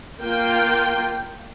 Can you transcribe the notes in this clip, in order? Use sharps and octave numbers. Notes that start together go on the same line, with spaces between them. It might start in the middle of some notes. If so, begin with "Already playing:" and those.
A#3 F4 G5